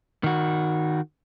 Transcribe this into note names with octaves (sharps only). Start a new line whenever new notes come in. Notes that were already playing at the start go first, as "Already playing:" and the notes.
D#3 F#4